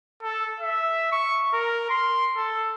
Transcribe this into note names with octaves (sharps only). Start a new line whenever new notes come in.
A4
E5
C#6
A#4
C6
A4